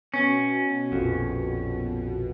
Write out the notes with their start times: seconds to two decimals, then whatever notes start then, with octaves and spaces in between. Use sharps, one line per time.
0.14 B2 C#4
0.92 A#1 F2